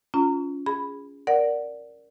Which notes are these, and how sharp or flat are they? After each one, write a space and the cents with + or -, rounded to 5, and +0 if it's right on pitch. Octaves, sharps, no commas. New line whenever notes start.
C#4 +25 F4 +0 A#5 -20
G#4 -10 B5 +0
A#4 +0 D5 -5 F#5 +0